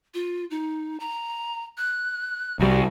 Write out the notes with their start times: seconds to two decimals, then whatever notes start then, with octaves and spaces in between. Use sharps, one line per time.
0.14 F4
0.51 D#4
1.00 A#5
1.77 F#6
2.59 C2 G3 F#4